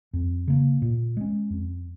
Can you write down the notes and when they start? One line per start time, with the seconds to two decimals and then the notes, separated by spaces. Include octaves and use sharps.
0.13 F2
0.48 C#3 A#3
0.82 A#2
1.17 G#3 C#4
1.50 F2